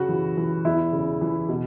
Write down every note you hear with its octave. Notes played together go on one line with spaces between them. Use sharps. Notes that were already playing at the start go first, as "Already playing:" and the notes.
Already playing: F#2 C#3 F#4
E3
E3
E2 E4
C#3
E3
B2